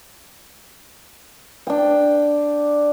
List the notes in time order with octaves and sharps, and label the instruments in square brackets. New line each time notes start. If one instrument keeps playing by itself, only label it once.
[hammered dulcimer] D4 G5